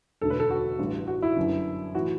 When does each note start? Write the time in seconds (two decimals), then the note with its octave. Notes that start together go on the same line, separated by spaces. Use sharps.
0.21 E1 D2 D3 A4
0.30 B4
0.40 A4
0.50 F#4
0.79 A1 G2 D3
1.07 F#4
1.22 E4
1.36 G1 F#2 D3
1.95 A2 E3 F#4